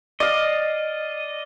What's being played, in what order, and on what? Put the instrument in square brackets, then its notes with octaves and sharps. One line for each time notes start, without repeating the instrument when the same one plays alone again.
[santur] D5 F5 [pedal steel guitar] D#5